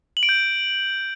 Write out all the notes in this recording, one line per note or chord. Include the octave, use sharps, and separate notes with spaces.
F#7
D7
G6